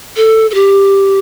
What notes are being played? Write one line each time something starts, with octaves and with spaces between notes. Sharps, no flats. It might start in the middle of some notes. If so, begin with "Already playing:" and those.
A4
A4
G4